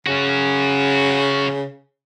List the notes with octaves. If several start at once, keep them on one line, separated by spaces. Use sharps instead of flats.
C#3 C#4 F#4